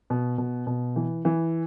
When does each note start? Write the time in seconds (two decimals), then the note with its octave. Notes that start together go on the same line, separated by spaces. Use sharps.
0.10 B2
0.38 B2
0.67 B2
0.96 E3
1.25 E3